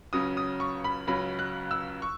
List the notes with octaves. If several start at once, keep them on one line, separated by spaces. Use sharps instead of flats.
C#2 C#3 F#3 C#4 D#6
D#6
C#6
B5
C#2 C#3 F#3 C#4 B5
F#6
E6
C#6